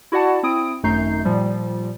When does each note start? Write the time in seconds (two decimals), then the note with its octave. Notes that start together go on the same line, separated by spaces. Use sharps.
0.12 E4 F#4 D5 F#5 A5
0.43 C4 E4 D#6 D7
0.83 G#1 F#2 A3 D#4 G6 C7
1.25 A#2 F3 G3